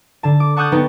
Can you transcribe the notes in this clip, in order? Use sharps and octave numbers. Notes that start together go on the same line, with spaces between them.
D3 A5
D6
F#5 A5 C#6 D#6 F#6 G6
B3 D#4 G5